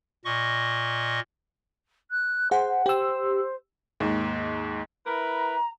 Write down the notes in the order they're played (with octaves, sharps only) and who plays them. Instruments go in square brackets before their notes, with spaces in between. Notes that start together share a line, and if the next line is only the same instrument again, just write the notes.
[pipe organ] A#2 D#5 C#6
[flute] F#6
[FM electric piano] G#4 F#5 [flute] C5
[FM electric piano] G4 E6 [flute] C5
[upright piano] D#2 G#2
[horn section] E4 A#4 B4 [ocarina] A#5